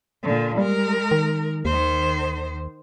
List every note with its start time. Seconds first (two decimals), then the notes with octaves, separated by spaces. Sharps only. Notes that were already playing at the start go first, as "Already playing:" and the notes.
0.23 A#2 D3
0.58 G3 G#3 A#4
1.11 D#3
1.65 D#2 D#3 C5